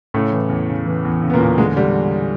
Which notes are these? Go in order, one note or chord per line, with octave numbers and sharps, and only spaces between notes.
A2 C#3 A3
E3
E2
C#3
E3
E2
C#3
B3
A#2 A#3
E2
D3 G#3
D3 G3